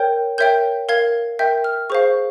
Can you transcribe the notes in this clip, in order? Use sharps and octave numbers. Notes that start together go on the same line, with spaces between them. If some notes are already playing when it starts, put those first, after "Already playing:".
Already playing: A#4 C#5 G5 G6
A#4 C#5 E5 G5 G6
A#4 F5 G#6
A#4 E5 G5 G6
F6
G#4 C5 F5 C#6